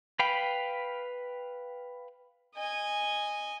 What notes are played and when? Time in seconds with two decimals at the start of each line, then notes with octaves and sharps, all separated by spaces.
0.19 B4 F5 G5 B5
2.55 D#5 G#5